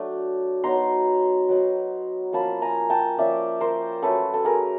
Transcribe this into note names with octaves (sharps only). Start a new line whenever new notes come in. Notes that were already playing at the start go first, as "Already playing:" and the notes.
Already playing: F#3 A3 D4
F#3 B3 D#4 A#5 C6
F#3 B3 D#4
F3 A#3 C#4 F4 A5 B5
G#5 A#5
G5 A5
F3 A#3 C#4 F4 D5 E5
A#4 C5
F#3 A3 C#4 A4 B4
A4
G#4 A#4